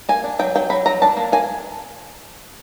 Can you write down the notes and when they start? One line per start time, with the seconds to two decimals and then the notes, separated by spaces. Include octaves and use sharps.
0.09 A#3 G#5
0.24 D4
0.39 F#3 G5
0.55 F#3 G5
0.70 F#3 B5
0.86 F#3 A#5
1.02 D4 A5
1.17 A#3
1.32 A#3 G#5